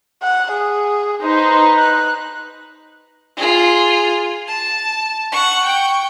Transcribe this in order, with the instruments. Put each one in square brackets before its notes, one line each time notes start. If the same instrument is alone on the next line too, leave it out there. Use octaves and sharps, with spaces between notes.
[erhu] F#5
G#4
[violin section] D#4 B4 [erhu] C5
[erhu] F#6
[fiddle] F4 G#4
A5
F#5 C#6
G5 C#6